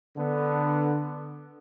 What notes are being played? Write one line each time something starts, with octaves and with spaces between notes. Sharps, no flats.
D3 B3